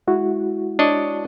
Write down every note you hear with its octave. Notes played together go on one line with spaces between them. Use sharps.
G#3 E4 F#4
D4 C#5 D#5